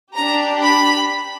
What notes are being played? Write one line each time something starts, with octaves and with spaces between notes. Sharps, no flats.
D4 G4 A#5
B5